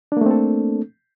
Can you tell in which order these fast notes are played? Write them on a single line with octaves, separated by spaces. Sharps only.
D4 A#3 A3 C4 A4